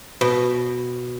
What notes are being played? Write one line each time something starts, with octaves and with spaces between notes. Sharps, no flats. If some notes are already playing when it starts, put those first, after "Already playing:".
B2